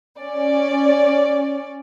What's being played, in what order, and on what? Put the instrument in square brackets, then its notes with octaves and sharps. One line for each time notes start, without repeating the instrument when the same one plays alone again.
[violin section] C#4 D5